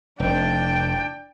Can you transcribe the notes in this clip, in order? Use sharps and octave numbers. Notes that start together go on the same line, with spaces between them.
F1 D4 G5